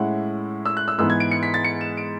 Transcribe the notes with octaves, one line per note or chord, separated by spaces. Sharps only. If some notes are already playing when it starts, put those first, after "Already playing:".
Already playing: A2 G#3 C#4 E4 F#5
E6
F#6
E6
G#2 E3 G#3 B3 E6
G#6
D7
C#7
B6
A6
C#7
E7
D7